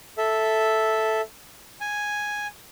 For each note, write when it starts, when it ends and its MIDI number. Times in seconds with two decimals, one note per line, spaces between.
0.18 1.21 69
0.18 1.21 76
1.81 2.47 80